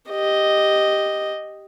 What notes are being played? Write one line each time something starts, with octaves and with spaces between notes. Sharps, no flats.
G4 D#5